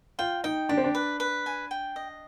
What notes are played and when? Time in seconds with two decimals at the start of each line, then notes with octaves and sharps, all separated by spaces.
0.19 F4 G5
0.44 D#4 G5
0.69 D4 G4
0.77 C4
0.84 D4
0.95 B4
1.20 B4
1.46 G#5
1.71 G5
1.96 D#5